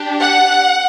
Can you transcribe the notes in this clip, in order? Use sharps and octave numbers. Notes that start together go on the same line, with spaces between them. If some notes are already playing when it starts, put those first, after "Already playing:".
Already playing: D4 G4
F#5